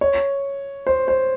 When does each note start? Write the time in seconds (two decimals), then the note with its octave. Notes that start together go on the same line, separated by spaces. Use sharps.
0.01 C#5
0.87 C5
1.08 C5